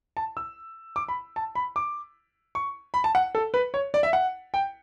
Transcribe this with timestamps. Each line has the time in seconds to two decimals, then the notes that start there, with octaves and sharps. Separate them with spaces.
0.17 A5
0.37 E6
0.96 D6
1.09 B5
1.36 A5
1.55 B5
1.76 D6
2.55 C#6
2.94 B5
3.04 A5
3.15 F#5
3.35 A4
3.54 B4
3.74 C#5
3.94 D5
4.03 E5
4.13 F#5
4.54 G5